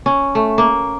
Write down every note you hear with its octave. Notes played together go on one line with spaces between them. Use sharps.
C#4
A3
A#3